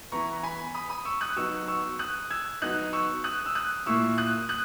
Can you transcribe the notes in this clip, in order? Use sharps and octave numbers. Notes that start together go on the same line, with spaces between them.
E3 B3 E4 A#5 C#6
A#5
G#5 B5
B5 D#6
B5 D#6
C#6 E6
D#6 F#6
F#3 B3 D#4 C#6 E6
C#6 E6
D#6 F#6
E6 G#6
F#3 B3 D#4 D#6 F#6
C#6 E6
D#6 F#6
E6
D#6 F#6
A#2 A#3 E4 C#6 E6
D#6 F#6
D#6 F#6